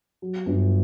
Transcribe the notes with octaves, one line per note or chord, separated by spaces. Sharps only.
F#3
G1